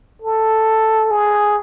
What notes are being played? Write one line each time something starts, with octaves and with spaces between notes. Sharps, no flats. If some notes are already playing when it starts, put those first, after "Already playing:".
A4
G#4